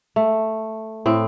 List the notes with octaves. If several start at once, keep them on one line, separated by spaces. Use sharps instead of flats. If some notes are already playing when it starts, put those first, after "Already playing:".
A3
A2 C4